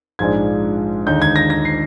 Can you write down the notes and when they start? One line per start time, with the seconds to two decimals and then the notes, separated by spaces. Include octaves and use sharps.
0.19 A#1 G#2 F3 G#3 D4 G#6
1.07 D#2 D3 G#3 D#4 G6
1.22 G#6
1.36 A#6
1.50 A#6
1.65 C7